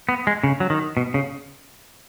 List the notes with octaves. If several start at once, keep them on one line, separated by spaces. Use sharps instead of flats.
B3
G#3
C#3
F#3
D#3
B2
C#3